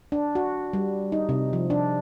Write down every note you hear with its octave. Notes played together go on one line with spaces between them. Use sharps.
D4
F#4
G3
D#4
C3
F3
D4